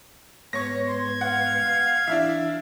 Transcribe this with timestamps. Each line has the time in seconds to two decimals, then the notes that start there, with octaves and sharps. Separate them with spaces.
0.53 G#2 B3 C#5 C#6 A#6
0.87 C6 G#6
1.21 F5 F#5
2.08 E3 D4 E4 E5